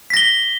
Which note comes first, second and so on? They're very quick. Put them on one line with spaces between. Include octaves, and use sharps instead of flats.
B6 A#6 G7